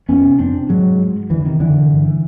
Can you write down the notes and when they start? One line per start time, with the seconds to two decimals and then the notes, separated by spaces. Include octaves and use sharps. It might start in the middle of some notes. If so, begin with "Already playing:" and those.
0.09 F2 B3 C#4
0.24 C3
0.39 F2 C4 D4
0.54 C3
0.69 G#2 F#3 G#3
0.99 G#2
1.30 F2 D3 E3
1.45 C3 D#3
1.60 F2 D3 E3
1.76 C3
1.91 G2
2.06 D3